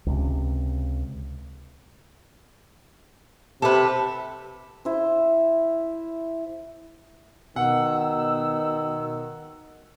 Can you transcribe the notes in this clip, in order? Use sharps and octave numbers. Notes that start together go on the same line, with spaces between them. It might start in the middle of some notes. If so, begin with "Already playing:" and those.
C#2 C3
C3 A4 B4
E4 C5
B2 D#3 F#5 E6